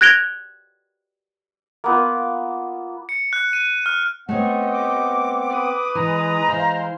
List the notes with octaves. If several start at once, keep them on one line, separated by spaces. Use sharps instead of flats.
F#6 G#6 A#6 D7 F7 G7
A#3 B3 F4
C#7
F#6
D#7
F6
A3 B3 C4 G4 C#5 D#5 F#5
D6
B4 D#6
E3 G#3 A#5
E3 C5 F5